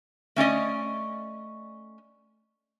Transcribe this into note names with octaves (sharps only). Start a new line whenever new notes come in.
A3 C#4 D5 D#5